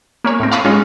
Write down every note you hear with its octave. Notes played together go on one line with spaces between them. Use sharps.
A#3 C#4 C#5
A2 C4
F5 A5 B5 C#6 D#6 F#6
G#3 C#4 F4